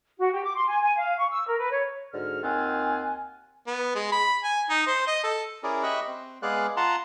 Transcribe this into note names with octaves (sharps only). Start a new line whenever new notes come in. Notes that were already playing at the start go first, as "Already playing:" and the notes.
F#4
G4
D6
C6
G#5
G#5
F5
C#6
E6
A#4
B4
C#5
G#2 D3 F#4 F6
D#2 D#3 C4 F4 F#5 G#5
B3
G#3
B5
G#5
D#4
C5
D#5
A4
C#4 E4 G#4 A#4 D5
G4 D#5 E5 B5 C#6 F#6
C4
G#3 B3 G#4 D5 F5 F#6
F4 F#5 A5 A#5 C6